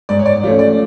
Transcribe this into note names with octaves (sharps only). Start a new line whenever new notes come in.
G#2 D5
C#5
D5
F3 A3 C#4 C#5
D5